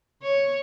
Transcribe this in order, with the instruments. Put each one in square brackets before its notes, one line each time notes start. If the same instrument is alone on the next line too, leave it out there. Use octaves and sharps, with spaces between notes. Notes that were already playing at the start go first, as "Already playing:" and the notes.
[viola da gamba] C#5